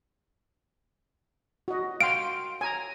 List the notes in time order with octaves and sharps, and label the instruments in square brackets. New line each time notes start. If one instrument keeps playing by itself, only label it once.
[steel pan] F#4 D#5
[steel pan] F5 G5 C6 [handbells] D7
[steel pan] G#5 A#5